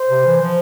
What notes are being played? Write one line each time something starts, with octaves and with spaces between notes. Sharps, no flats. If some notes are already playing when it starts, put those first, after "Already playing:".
Already playing: C5
C3
E3
F3